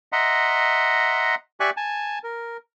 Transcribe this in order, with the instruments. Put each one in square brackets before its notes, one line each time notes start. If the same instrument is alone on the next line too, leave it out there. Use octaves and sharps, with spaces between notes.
[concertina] D#5 E5 F#5 A#5 C6
G4 D5 E5 G#5 C#6 F#6
G#5 A5
A#4